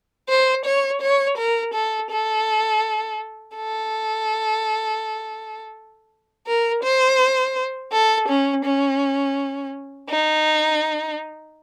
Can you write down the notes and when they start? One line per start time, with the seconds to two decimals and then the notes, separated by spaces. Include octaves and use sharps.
0.29 C5
0.65 C#5
1.02 C#5
1.38 A#4
1.74 A4
2.11 A4
3.56 A4
6.46 A#4
6.83 C5
7.92 A4
8.28 C#4
8.65 C#4
10.10 D#4